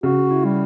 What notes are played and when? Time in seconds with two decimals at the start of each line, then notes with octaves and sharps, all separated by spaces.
0.03 C#3 F#4
0.30 E4
0.44 G3